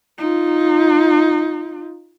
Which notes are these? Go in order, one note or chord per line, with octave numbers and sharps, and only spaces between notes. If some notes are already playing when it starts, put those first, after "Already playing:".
D#4 F4